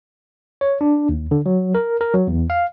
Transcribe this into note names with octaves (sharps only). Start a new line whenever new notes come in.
C#5
D4
D#2
D3
F#3
A#4
A#4
F#3
E2
F5